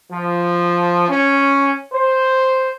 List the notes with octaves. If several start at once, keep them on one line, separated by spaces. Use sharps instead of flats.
F3
C#4
C5